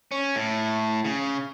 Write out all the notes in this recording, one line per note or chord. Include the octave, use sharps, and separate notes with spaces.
C#4
A2
C#3